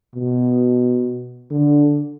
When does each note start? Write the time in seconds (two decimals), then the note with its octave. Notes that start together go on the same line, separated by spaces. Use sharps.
0.15 B2
1.51 D3